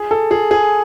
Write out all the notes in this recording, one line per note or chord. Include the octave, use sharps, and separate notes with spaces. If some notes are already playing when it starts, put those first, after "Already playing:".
Already playing: G#4
A4
G#4
G#4